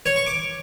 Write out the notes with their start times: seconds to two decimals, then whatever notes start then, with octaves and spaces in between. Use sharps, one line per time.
0.06 C#5
0.16 C#6
0.26 D6